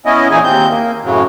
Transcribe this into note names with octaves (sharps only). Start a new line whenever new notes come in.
B3 C#4 E4 D#5
A#2 E3 D#4 E4 G#4 G#5
D#2 C4 G6
A#3
F#2 A2 C#3 F#3